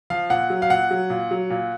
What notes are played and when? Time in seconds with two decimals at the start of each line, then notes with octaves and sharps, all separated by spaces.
0.10 F3 F5
0.30 A#2 F#5
0.50 F#3
0.62 F5
0.70 A#2 F#5
0.91 F#3
1.10 A#2
1.31 F#3
1.50 A#2